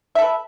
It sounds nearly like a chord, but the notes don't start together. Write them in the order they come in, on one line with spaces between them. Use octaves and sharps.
E5 A4 B4